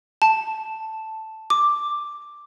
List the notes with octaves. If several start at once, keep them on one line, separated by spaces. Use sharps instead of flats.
A5
D6